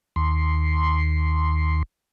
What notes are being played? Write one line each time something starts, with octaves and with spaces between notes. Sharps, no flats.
D#2 C6